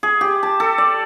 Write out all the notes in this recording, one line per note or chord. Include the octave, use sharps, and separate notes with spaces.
G#4
G4
A5
A4
D5